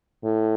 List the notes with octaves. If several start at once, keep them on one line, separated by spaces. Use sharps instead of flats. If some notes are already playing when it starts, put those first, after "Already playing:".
A2